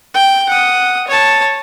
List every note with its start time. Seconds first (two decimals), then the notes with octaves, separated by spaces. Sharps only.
0.14 G5
0.49 F#5 D#6
1.08 C#5 A5